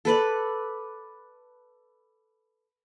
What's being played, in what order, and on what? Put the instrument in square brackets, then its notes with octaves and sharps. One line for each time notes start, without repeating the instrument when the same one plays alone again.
[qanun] A4 B4 D5